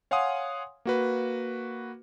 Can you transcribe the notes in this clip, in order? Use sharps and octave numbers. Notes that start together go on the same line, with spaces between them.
C#5 F5 F#5 G#5 C6 D#6
A#3 F#4 B4